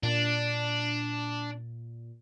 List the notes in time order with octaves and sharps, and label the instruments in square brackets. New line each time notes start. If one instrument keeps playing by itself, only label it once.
[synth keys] A#2 [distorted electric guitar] D4